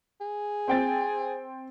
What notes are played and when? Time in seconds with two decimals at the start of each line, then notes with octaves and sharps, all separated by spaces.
0.21 G#4
0.68 C4 G5 A6